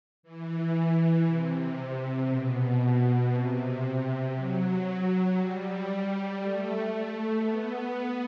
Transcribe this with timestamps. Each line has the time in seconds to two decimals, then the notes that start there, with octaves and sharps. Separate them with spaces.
0.23 E3
1.25 C3
2.28 B2
2.79 B2
3.30 C3
4.32 F#3
5.35 G3
6.38 A3
6.88 A3
7.40 B3